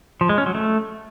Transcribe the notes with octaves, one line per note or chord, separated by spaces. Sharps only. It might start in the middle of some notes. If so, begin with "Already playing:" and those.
F3
G#3
C#4
F#3
A3